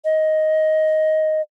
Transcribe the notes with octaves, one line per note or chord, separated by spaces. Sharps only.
D#5